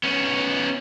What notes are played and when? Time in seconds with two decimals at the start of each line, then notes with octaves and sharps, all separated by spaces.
0.03 B3 C#4